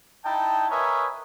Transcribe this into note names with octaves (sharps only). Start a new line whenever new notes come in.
D#4 E4 G5 A5
A#4 B4 C#5 D#5 E5 G#5